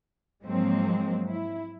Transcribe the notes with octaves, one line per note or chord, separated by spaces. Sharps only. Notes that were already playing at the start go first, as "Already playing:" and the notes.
G#2 F3 F#3 G#3 A#3 C4
E4